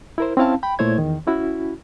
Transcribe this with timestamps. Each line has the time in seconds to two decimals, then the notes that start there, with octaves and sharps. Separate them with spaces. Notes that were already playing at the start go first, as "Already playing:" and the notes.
0.18 E4 A#4 C5
0.37 C4 C#4 E4 F5 A5
0.63 G5 B5
0.79 A#2 A3 E4 C5 C#5 G#6
0.98 E2 D#3
1.27 C#4 E4 F#4